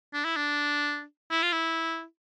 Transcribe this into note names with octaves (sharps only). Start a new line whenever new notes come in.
D4
E4
D4
E4
F4
E4